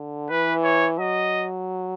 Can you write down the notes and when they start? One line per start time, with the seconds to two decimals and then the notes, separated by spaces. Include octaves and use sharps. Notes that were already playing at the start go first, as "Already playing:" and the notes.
Already playing: D3
0.30 E3 B4
0.64 C#5
0.99 F#3 D#5